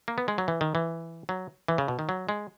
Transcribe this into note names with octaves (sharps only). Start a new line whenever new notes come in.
A#3
B3
G#3
F#3
E3
D#3
E3
F#3
E3
C#3
B2
D#3
F#3
G#3